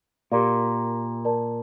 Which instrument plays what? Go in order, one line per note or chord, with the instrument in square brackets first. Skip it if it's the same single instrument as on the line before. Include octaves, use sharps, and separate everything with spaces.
[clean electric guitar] A#2 [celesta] G4 A#4 D5 F5
[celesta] A#4 D5 A5